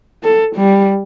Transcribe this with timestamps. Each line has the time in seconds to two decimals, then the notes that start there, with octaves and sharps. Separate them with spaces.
0.23 A4
0.56 G3